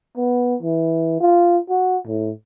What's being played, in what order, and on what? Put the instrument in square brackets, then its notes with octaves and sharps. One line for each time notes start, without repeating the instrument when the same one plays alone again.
[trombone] B3
E3
F4
F#4
A2